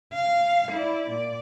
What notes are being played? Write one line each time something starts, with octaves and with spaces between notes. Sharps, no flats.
F5
E4 D5
A#2 D5